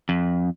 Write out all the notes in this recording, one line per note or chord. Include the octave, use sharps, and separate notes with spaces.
F2